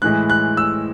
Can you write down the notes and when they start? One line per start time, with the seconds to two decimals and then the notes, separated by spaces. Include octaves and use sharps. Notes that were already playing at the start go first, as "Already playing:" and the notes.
0.02 A2 E3 G#3 F#6
0.30 F#6
0.57 E6